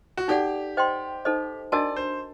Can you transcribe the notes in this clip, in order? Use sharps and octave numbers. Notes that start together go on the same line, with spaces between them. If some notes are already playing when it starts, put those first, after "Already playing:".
F#4
D#4 G4 A4 D5 F#5
C5 D#5 G5 C6
D#4 A4 C5 D#5
D4 F#4 A#4 D5 D#5 A5
C5